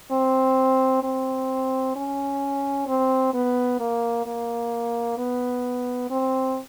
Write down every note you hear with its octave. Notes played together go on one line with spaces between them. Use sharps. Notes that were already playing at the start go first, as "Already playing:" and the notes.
C4
C4
C#4
C4
B3
A#3
A#3
B3
C4